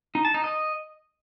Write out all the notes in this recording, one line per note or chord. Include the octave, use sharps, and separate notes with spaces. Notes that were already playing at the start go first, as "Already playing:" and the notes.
D#4
A5
D#4
D#5